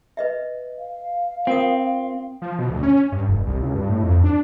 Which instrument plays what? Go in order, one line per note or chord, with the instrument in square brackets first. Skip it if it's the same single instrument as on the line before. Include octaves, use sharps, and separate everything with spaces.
[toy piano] B4 D#5 E5
[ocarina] F5
[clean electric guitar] C4 [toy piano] F4 A#4 D#6
[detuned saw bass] F3
B2
D2
C#4
G2
F1
C2
C#2
G2
A2
F2
D4